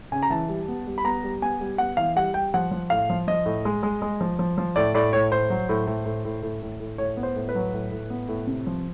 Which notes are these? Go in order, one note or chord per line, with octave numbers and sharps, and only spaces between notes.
C#3 G#5
A#5
E3 A5
G3
B3
G3
B5
B3 A#5
G3
B3 G#5
G3
B3 F#5
E3 F5
G3 F#5
G3 G5
F3 F#5
F3
A2 F5
F3
F3 D#5
A2
G#3
G#3
G#3
F3
F3
F3
A2 D5
A2 D5
A2 C#5
A2 C5
F#3
A2
A2
A2
A2
A2
A2
A2
A2 C#5
B3
C5
A2
B4
F#3
A2
A2
B3
A2
C3
F3